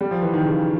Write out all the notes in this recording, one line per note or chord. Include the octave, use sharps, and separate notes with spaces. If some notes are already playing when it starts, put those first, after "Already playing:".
G3
F3
E3
D#3
C#3